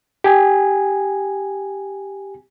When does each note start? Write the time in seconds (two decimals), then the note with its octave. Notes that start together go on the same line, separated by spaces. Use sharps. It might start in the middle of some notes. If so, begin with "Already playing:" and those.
0.24 G4 G#5